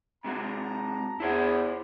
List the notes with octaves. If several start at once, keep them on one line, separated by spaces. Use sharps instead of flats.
C3 G#3 F#4 A5 A#5
E2 E4 C5 C#5